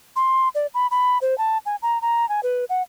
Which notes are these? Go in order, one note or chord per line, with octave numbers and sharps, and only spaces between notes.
C6
D5
B5
B5
C5
A5
G#5
A#5
A#5
G#5
B4
F#5